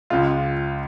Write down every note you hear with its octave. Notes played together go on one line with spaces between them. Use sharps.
C#2 C#3 G#3 F4